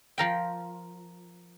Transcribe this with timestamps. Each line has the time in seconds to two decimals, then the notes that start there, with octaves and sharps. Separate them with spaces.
0.18 F3 A#4 G5